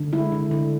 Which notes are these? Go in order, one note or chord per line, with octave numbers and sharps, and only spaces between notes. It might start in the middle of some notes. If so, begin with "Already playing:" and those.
Already playing: D3
G#3 E4
D3
D3